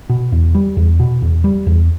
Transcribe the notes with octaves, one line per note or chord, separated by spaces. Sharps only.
B2
E2
G3
E2
B2
E2
G3
E2